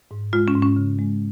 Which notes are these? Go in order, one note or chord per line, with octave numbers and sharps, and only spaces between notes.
G#2
G#3 F4
C#4
G#2
C#4
C#3
G#3